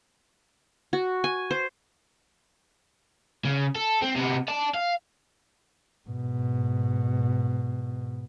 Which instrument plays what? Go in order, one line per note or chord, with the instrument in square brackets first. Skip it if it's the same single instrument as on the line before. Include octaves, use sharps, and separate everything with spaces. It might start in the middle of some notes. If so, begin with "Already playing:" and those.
[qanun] F#4
G#5
C5
[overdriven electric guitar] C#3
A4
C4
C3 B3
D5 A5
F5
[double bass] G#2 B2